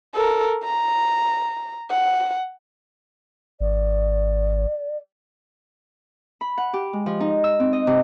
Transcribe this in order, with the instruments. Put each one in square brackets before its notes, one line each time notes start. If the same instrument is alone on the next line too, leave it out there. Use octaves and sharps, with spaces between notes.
[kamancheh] A4 A#4
A#5
F#5
[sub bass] G#1 [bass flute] D5
[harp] B5
F#5
G4
G#3
F3
D#4
E6
C4
D#5
C3